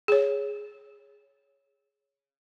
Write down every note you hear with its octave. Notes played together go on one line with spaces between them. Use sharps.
G#4 C#5